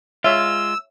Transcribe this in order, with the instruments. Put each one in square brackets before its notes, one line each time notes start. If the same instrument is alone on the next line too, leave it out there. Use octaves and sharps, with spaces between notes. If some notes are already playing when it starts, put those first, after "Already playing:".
[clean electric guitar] G#3 F4 [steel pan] C#5 E5 [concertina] E6